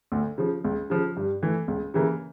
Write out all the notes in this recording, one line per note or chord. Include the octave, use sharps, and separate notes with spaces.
D2
C#3 F3
C#2
C#3 F3
G2
E3 A3
C#2
C#3 E3 A#3